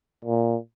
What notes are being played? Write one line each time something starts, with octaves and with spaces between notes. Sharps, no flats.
A#2